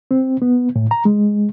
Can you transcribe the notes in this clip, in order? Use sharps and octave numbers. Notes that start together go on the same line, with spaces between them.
C4
B3
A2
A#5
G#3